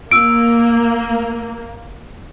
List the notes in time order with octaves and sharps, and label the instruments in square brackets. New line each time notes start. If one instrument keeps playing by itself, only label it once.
[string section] A#3 [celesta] E6 D7